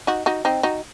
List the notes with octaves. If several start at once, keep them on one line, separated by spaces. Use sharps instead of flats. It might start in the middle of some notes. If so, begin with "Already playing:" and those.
D#4 F#4
D#4 F#4
C4 D#4
D#4 F#4